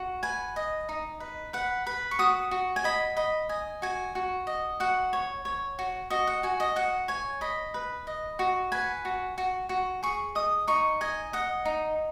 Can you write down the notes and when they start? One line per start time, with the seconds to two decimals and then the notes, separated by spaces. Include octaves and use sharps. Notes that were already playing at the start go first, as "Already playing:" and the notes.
Already playing: F#4
0.23 B4 G#5
0.56 D#5
0.89 D#4
1.20 B4
1.53 B4 F#5
1.86 B4 B5
2.11 C#6
2.19 F#4 D#6
2.51 F#4
2.76 G#5
2.84 D#5 B5
3.16 D#5 B5
3.49 D#5 G#5
3.82 F#4 G#5
4.15 F#4
4.47 D#5
4.80 F#4 F#5
5.13 C#5
5.45 C#5
5.79 F#4
6.10 F#4 D#5
6.27 F#5
6.43 F#4 G#5
6.60 D#5
6.76 F#4 F#5
7.08 C#5 G#5
7.41 D#5 B5
7.74 B4
8.07 D#5
8.39 F#4
8.72 B4 G#5
9.05 F#4
9.38 F#4
9.69 F#4
10.03 G#4 C#6
10.35 D#5 D#6
10.67 D#4 C#6
11.01 D#5 G#5
11.33 D#5 F#5
11.65 D#4